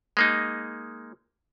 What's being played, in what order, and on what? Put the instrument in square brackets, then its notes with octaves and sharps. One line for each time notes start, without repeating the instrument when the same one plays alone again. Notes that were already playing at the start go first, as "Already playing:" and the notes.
[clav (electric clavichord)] G#3 A#3 D#4